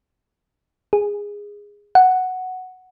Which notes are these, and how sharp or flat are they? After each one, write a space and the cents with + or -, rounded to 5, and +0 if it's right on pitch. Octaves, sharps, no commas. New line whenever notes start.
G#4 -15
F#5 +0